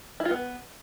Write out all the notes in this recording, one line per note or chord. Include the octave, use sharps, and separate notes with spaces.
E4
F4
B3